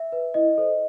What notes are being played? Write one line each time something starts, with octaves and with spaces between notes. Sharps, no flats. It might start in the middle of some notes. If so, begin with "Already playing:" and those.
Already playing: E5
B4
E4 D#5
A4 C5